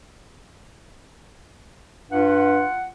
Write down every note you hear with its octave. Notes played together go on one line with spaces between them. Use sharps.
G2 F4 F#5